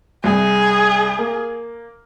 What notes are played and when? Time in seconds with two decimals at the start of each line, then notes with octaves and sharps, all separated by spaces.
0.24 C2 G#4
1.19 A#3